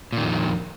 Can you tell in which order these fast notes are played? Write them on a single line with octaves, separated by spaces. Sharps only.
A#2 D#3 F2